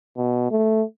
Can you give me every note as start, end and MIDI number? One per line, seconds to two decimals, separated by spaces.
0.17 0.46 47
0.51 0.83 57